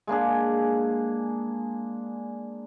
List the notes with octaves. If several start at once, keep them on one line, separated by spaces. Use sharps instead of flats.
G#3 A#3 D4 G#4